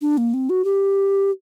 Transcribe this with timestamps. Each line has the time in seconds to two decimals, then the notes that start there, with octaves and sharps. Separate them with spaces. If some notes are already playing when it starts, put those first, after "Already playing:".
0.02 D4
0.18 A#3
0.34 C4
0.50 F#4
0.65 G4